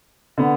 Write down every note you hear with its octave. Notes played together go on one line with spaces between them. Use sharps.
D3 B3